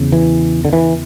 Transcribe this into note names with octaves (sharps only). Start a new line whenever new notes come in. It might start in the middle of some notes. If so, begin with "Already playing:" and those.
Already playing: E2 C#3
E3
D3
E3